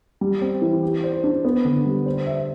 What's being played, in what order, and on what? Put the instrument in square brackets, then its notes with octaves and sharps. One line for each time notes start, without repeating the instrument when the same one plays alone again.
[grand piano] G3
C4
E3
G4
C5
D4
B3
D3
G3
C5
E5